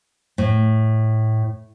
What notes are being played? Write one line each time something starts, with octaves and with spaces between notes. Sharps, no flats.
A2